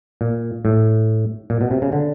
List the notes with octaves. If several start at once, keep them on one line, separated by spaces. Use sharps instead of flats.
A#2
A2
A#2
B2
C3
C#3
D3